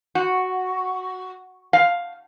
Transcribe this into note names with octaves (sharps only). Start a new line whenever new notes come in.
F#4
F5